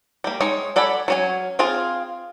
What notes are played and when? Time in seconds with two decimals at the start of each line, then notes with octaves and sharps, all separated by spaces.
0.24 G3 A#3
0.41 G#3 D#4 C#5
0.76 A4 D5 F#5 G#5 B5
1.08 F#3 C#4 G#5
1.59 C4 F4 G#4 F5